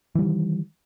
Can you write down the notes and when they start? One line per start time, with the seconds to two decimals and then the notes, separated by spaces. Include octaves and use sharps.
0.15 E3
0.19 G3
0.22 D#3